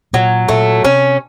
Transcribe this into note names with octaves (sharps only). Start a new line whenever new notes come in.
A#2 F#3
A#2 A3
C3 C#4